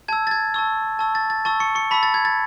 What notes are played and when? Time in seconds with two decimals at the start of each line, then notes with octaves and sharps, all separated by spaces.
0.08 A5 E6 G#6
0.27 A6
0.31 G#6
0.54 A5 C#6 E6
0.99 A5 C#6 E6
1.15 A6
1.30 A6
1.45 A5 C#6 E6 A6
1.60 C#6 C#7
1.75 C#6 C#7
1.91 A5 B5 C#6 E6 B6
2.03 A6
2.14 G#6
2.25 A6